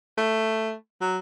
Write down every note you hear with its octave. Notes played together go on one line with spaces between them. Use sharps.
A3
F#3